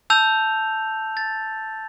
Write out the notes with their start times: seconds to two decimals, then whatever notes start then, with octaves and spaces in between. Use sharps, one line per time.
0.10 A5 E6 G6 F7
1.17 A6